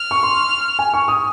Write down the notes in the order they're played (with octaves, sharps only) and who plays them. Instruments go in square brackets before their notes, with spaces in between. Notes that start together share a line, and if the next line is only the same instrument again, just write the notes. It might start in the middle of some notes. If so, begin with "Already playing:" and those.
Already playing: [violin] F6
[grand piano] C#6
C6
G#5
C#6
D#6